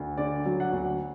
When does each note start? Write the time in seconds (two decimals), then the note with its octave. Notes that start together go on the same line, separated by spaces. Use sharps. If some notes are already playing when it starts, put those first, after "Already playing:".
Already playing: D2
0.17 D3 D5
0.46 F#3
0.60 F#5
0.73 D2